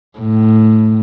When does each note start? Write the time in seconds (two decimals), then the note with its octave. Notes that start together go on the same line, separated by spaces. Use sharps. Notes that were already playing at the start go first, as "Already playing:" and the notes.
0.19 A2